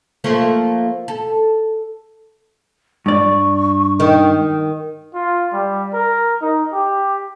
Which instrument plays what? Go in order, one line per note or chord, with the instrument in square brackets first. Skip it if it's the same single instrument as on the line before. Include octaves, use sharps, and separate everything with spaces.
[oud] F3 A3 A#3
A4
[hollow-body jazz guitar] G2 D5 [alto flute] C#6
[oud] D#3
[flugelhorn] F4
G3
A#4
D#4
G4